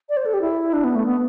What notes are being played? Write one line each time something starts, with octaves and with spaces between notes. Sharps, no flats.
D5
C5
A4
G4
E4
D4
B3
A3
B3